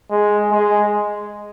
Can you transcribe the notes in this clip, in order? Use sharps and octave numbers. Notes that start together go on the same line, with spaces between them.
G#3
G#3